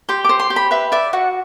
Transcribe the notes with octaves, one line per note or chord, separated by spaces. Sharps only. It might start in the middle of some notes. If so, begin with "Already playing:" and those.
G4 C6
C5 D6
C6
G4
B5
B4 E5
D5 E5
F#4 F#5